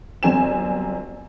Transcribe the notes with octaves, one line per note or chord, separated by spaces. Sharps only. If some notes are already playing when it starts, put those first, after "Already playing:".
G1 F#2 C4 G#5 E7